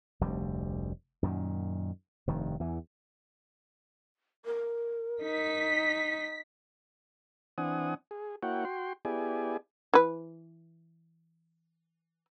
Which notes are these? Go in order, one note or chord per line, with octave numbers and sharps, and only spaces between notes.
F1 D2 G3
F#2 A#2 D#3
F1 G2 D#3
E2 E3
A#4
D#4 B6
E3 C4 D4 F#5 G#5 D#6
G#4
A#3 E4 F#4 C#5 F#5 G5
F#4 G5 C6
B3 E4 G4 G#4 D5 G#5
E3 B4